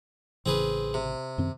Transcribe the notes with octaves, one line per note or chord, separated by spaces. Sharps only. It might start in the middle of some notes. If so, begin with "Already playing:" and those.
A1 C#3 E3 C4 G#4 B4
C3
F#2 D#3 C4